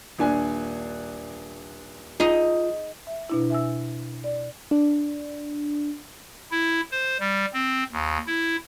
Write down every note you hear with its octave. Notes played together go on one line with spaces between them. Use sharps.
D#1 D4 G#5
D#4 F4 G#4 D#5
E5
B2 D4 E4
E5 G#5 E6
D5
D4
E4
C5
G3
C4
D#2
E4